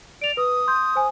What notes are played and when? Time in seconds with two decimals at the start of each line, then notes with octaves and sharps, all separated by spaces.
0.21 D5 D7 F7
0.37 B4 D#6
0.67 C6 G6
0.96 C5 G#5